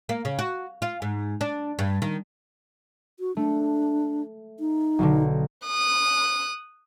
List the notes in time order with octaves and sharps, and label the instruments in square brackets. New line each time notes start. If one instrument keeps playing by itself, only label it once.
[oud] A#3
C#3
F#4
F4
G#2
D4
G2
D#3
[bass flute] F#4
[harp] A3 [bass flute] D4
[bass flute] D#4
[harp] B1 B2 D3
[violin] D#6 F#6